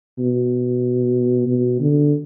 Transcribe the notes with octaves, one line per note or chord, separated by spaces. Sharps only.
B2
B2
D3